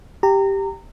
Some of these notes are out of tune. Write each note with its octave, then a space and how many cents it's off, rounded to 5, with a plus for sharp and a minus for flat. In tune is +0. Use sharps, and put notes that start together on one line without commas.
G4 +0 A#5 -25